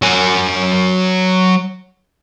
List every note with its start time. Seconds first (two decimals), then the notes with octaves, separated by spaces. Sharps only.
0.02 F#3 G#5